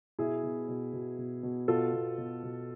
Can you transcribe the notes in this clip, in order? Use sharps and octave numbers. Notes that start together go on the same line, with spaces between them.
B2 E4 G#4
B2
B2
B2
B2
B2
B2 F4 A4
B2
B2
B2